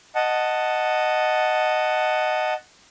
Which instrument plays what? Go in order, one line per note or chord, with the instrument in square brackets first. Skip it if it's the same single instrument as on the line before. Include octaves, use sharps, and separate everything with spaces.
[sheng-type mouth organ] D#5 F#5 A5